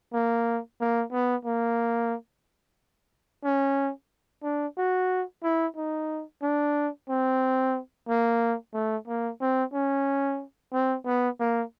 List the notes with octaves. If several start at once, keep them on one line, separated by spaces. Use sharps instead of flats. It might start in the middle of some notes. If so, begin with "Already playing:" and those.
A#3
A#3
B3
A#3
C#4
D4
F#4
E4
D#4
D4
C4
A#3
A3
A#3
C4
C#4
C4
B3
A#3